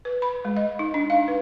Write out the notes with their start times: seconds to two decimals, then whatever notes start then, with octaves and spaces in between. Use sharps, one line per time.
0.05 B4
0.22 B5
0.45 G#3
0.57 D#5
0.79 D#4
0.94 D4
1.10 F5
1.28 B4